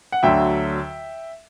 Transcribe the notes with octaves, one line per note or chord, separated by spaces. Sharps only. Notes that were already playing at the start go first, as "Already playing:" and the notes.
F#5
D2 D3 F#3 E5 G5